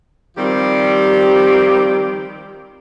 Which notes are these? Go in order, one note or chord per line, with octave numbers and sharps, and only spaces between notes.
D#3 F3 G3 C4 G4